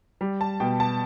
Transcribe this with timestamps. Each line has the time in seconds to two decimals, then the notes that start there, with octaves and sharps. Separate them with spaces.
0.21 G3
0.41 A5
0.60 B2 G5
0.80 A5